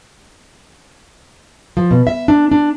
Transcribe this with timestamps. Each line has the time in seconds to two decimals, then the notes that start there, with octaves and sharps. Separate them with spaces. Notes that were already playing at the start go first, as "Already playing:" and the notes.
1.77 F3
1.91 B2
2.07 E5
2.28 D4
2.52 D4